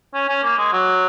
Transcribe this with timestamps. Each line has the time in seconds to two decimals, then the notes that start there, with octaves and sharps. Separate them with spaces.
0.14 C#4
0.29 C#4
0.43 A#3
0.58 G#3
0.72 F#3